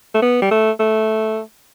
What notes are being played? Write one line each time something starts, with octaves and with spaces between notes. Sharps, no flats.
A3
B3
G3
A3
A3